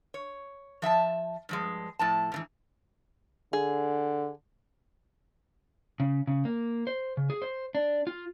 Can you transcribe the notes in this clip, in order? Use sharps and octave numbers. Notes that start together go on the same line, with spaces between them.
C#5
F3 E5 F5 A5
G2 F3 G#3
A2 F3 A5
G#2 D3 E3
D3 G#4
C#3
C#3
A#3
C5
C#3
G#4
C5
D4
F4